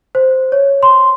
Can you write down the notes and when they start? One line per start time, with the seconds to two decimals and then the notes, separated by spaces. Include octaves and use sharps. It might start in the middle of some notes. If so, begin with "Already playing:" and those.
0.15 C5
0.52 C#5
0.83 C6